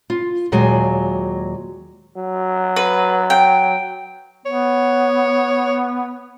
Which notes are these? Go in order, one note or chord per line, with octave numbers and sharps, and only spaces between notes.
F4
D#2 A#2 F#3 G#3 G#5
F#3
B4
G5
B3 C#5